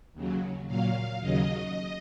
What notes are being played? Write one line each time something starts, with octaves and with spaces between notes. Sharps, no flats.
D#2 C#3 F#3
A#2 F#3 F5
D#2 C#3 F#3 D#5